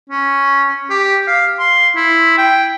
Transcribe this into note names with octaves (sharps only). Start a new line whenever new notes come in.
C#4
G4
F5
C6
E4
G5